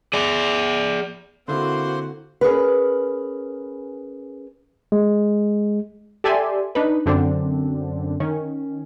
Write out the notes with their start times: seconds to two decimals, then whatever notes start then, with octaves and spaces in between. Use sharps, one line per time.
0.13 G#4 D5
1.48 D3 A#3 C4 E4 F#4 C5 C6
2.41 C#4 G#4 A#4 B4
4.92 G#3
6.24 G4 A4 D5 E5 G#5 C6
6.75 D4 D#4 B4
7.06 F#2 D3 C4 D4
8.20 D#3 C#4